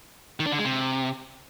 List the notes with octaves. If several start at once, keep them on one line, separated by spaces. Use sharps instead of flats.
D#3
D4
D3
G#3
C3